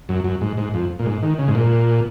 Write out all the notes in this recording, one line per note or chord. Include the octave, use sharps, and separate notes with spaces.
F#2
F#2
G#2
G#2
F2
A#2
G#2
D#3
C#3
G#2
A#2